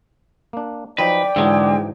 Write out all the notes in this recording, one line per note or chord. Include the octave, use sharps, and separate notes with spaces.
A#3 D4
F3 F#3 D#4 B4 D5 G5
G#2 D3 E3 F#3 G#3